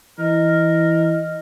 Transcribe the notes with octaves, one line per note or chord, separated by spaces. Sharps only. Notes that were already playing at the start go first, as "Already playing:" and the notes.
E3 A#4 D#5